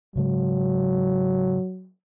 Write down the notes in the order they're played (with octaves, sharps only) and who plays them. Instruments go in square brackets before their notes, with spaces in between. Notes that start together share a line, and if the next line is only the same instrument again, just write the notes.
[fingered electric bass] G#2 C#3 G#3 [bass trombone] F#3